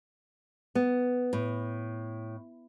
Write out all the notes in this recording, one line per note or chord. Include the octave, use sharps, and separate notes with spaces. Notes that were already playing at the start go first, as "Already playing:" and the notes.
B3
A2